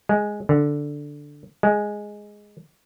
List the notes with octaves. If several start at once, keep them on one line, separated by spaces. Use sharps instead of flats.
G#3
D3
G#3